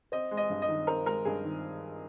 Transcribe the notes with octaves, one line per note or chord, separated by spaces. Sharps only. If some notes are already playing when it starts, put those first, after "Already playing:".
C4 D#5
G#3
D#5
G2
D#5
D#3
C4 A#4
G#3 A#4
G2 G#4
D#3